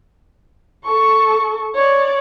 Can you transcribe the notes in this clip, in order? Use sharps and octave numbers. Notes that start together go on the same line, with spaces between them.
A4 C#6
C#5 D5